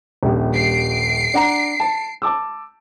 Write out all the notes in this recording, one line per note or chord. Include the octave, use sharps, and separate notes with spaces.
D#1 A#1 G3
C7 D7
D4 F#5 A#5
A5
A5 D6 E6